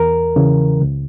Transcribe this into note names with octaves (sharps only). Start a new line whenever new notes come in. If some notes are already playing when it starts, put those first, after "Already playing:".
Already playing: E2 A#4
C#3 E3
C#2